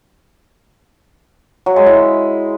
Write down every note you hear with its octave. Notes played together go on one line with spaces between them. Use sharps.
F#3
G#3
E4